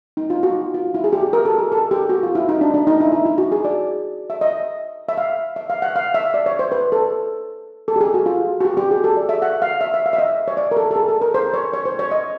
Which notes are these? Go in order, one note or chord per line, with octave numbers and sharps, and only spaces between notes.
D#4
F4
F#4
F4
E4
G#4
G4
F#4
A#4
A4
G#4
A4
G4
F#4
F4
E4
D#4
D4
D4
D#4
E4
E4
E4
F#4
G#4
D5
E5
D#5
E5
F5
E5
F5
F#5
F5
E5
D5
C#5
C5
B4
A4
A4
G4
G#4
F#4
F4
F#4
G4
G4
G#4
A4
D5
E5
F#5
F5
E5
E5
F5
E5
D#5
C#5
D5
A#4
A4
A4
G#4
A4
A#4
C5
C#5
C#5
C5
C#5
D#5